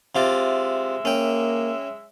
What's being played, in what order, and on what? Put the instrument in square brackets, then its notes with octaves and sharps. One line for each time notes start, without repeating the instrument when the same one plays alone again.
[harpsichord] C3 F4 D5 [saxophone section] G#3 E5
[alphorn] A#3 [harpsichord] C#4 G5